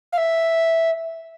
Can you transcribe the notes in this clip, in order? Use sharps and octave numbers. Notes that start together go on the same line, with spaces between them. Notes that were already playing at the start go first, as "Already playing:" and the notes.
F5
E5